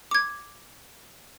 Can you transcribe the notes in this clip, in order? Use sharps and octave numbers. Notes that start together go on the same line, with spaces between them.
D6 G#6